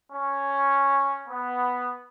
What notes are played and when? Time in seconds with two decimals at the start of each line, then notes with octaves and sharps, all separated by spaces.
0.12 C#4
1.29 B3